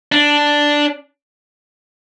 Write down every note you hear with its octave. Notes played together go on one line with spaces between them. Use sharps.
D4